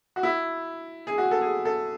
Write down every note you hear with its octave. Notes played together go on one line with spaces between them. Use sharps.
F#4
E4
G#4
F#4
A4
G#4
A4